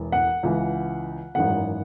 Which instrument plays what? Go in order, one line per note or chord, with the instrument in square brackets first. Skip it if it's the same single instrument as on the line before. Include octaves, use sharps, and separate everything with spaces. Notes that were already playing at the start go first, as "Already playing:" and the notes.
Already playing: [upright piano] E1 E3
F#5
C#2 C#3 E3
G#1 F#2 E3 F#5